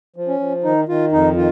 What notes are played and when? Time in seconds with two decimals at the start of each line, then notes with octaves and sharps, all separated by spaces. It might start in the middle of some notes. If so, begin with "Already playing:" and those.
0.16 F3
0.28 C#4
0.40 F3
0.64 D#3 D#4
0.88 D#3 F4
1.12 F2 D#4
1.36 D#3 F4